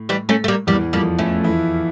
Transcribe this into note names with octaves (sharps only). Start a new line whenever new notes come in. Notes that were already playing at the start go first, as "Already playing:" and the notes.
Already playing: A2
E3 G3
A3 C#4
A3
G3 A#3
E2 E3 G3 A#3
F2 F3 G3 A#3
E3 A3 C#4 E4
E3 E4